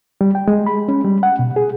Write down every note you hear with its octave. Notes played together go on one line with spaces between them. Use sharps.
G3
G5
G#3
B5
C#4
G3
F#5
B2
G#4